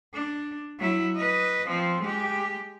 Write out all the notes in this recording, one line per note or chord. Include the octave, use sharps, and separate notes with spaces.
D4
F#3 E4
B4 D#5
F3 C4
G#3 G4